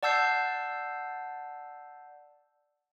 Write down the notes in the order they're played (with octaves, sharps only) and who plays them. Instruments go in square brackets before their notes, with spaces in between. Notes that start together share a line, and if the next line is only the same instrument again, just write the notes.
[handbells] D5 F#5 A5 E6 G6 C7